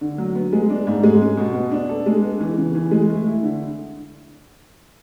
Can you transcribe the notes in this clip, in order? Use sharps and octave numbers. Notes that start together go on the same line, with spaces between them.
D3
F#3
B3
G#3
D4
G#2
G#3
C#4
B2
B3
D4
A4
G#3
B3
E3
C#3
E3
G#3
A3
E4
D3